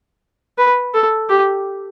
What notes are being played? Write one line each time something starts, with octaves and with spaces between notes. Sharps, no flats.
B4
A4
G4